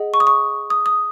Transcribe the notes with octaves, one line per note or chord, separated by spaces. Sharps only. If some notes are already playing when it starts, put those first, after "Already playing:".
Already playing: G#4 D#5 F#5
C#6
D#6
C#6
D#6
D#6